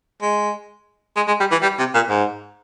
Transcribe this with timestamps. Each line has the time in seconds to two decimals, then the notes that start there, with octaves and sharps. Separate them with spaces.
0.22 G#3
1.16 G#3
1.28 G#3
1.40 G3
1.51 E3
1.62 G3
1.79 C3
1.95 A#2
2.09 G#2